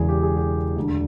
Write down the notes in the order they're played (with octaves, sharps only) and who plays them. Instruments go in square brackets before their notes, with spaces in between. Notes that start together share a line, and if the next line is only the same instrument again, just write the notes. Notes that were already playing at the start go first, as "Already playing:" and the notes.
Already playing: [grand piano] E1 E2 C#3 E3 G#4
G4
G#4
G4
E1 D2 D3